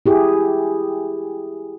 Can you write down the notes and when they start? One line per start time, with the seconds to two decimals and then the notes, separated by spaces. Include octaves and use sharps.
0.06 E4 G4 G#4